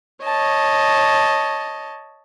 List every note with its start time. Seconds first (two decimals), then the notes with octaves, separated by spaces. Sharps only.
0.24 C#5 D#5 A5